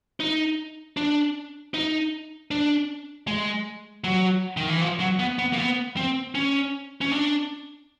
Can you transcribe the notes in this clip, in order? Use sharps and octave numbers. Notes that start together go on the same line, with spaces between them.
D#4
D4
D#4
D4
G#3
F#3
D#3
E3
F3
F#3
B3
B3
A#3
B3
C4
C#4
C#4
D4